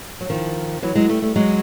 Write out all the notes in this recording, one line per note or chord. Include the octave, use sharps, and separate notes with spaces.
F#3
D#3 F3
E3 F#3
F#3 G#3
G3 A3
G3 A3
F#3 G#3